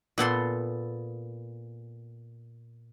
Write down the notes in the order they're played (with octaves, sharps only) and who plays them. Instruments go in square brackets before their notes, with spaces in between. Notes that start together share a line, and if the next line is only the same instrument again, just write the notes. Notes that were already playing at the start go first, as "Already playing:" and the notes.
[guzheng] A#2 B3 A4 C6